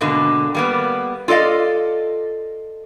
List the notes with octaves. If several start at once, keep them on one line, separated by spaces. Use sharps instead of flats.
G#2 B2 D3 A#3
G3 A#3 B3
F4 A4 D5 D#5 F5